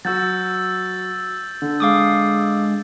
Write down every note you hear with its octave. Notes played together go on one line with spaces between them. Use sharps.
F#3 F#4 E6 G6 A6
D3
G#3 F5 D6 D#6